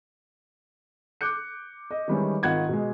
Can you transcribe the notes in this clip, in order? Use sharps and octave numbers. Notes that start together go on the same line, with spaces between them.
D6 F#6 G6 C#7
D#5
D#3 E3 G3 G#3 C#4 E4
G#1 D#3 F4 F#5 B5 G#6
B2 G#3